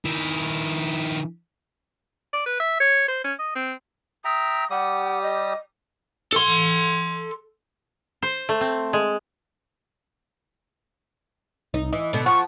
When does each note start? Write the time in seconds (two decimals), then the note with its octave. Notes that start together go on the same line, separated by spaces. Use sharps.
0.05 D#3 E4
2.33 D5
2.46 B4
2.60 E5
2.80 C#5
3.08 C5
3.24 C#4
3.39 D#5
3.56 C4
4.25 E5 G5 A#5 D#6
4.70 G3 G4 F#5 D#6
5.22 D#5
6.33 A4 C6
8.22 C5
8.49 A3
8.61 C4
8.93 G#3
11.74 C2 D#4
11.93 E3 D#5
12.13 B2 D3 B3
12.26 F3 F#5 C#6